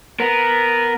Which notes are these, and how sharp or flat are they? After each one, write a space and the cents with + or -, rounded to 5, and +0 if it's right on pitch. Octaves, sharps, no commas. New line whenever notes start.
B3 +0 A#4 +0